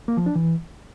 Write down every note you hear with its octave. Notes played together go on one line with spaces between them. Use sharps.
A#3
F3
D4
E3